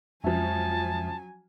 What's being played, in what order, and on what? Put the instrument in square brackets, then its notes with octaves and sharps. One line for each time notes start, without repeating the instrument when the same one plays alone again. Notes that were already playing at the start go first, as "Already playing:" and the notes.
[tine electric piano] F2 G#3 E5 [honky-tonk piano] F3 C#4 [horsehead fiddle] F#3 G#5 [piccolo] A5